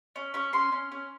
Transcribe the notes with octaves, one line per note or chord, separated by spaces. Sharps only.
C#4
C#4 C#6
C#4 C6
C#4
C#4